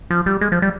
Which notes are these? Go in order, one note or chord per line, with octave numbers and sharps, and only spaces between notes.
F3
G3
G#3
F3
G3